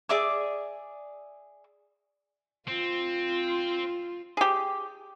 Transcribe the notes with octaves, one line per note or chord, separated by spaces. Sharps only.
G#4 D5 E5 D6
C4 F4
G4 G#4